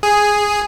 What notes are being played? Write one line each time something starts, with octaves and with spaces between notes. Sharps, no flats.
G#4